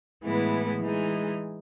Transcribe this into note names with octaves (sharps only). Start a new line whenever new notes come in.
A2 E3 G#3 B3 E4
E3 G#3 D#4